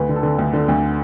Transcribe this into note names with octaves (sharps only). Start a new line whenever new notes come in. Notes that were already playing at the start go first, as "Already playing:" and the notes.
Already playing: D2 B4
D3
A4
D3
D2
D3
D2